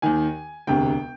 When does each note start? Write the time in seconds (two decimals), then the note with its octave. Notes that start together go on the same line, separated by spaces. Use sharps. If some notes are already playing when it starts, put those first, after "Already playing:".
0.02 D#2 D#3 G#5
0.67 E1 D2 C3 G5